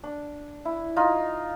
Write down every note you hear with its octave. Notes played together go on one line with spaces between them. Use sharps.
D4
E4
D#4 F4